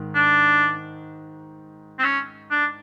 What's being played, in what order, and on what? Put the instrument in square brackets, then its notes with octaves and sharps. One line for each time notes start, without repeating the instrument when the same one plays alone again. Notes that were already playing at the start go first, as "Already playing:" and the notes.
Already playing: [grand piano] G#2 D#3
[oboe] D4
C4
C#4
D4